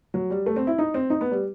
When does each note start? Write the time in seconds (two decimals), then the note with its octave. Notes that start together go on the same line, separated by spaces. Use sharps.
0.14 F#3
0.30 G3
0.46 A3
0.56 C4
0.67 E4
0.78 D#4
0.94 C4
1.10 D#4
1.21 B3
1.31 G3